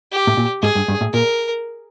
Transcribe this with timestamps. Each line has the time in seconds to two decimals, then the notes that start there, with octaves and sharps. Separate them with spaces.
0.12 G4
0.27 A2
0.37 A#2
0.62 G#2 G#4
0.75 G2
0.88 G2
1.01 A2
1.14 A#2 A#4